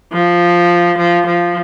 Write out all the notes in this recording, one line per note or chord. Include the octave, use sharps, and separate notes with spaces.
F3
F3
F3